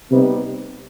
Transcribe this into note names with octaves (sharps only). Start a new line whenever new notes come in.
C3 G3 B3 D#4 G4 B4